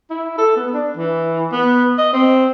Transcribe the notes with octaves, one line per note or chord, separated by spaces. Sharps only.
E4
A4
B3
D4
E3
B3
D#5
C4